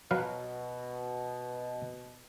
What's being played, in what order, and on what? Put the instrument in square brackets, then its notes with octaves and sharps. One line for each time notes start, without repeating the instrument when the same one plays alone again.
[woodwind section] B2 [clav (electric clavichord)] F#3 B4 F5